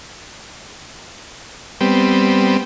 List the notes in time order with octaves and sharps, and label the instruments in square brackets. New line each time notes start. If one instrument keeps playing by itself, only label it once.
[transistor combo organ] G3 B3 C4